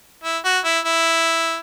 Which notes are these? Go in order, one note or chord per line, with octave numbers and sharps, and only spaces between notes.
E4
F#4
E4
E4